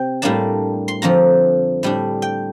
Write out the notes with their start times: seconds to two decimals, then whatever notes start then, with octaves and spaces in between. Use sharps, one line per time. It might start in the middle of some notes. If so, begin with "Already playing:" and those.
Already playing: C3 G5
0.22 A2 G3 A#3 D4 A5
0.88 C6
1.02 F2 D3 F3 A#5
1.83 A2 G3 D4
2.22 G5